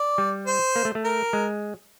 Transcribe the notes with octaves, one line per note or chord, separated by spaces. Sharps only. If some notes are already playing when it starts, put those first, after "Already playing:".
Already playing: D5
G3
C5
A#3
A3
A3
A#4
G#3